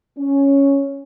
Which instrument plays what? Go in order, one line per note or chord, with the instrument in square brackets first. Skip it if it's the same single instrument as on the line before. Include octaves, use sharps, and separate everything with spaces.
[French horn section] C#4